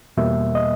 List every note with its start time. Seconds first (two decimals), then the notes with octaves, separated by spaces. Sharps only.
0.17 E2 B2 G3 A#3 E5
0.55 D#5